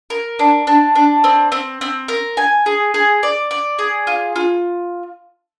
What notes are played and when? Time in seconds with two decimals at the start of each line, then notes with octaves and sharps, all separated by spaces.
0.10 A#4
0.39 D4
0.67 D4
0.95 D4
1.24 C4
1.52 C4
1.81 C4
2.08 A#4
2.37 G#5
2.66 G#4
2.94 G#4
3.23 D5
3.51 D5
3.79 G#4
4.07 F4
4.36 F4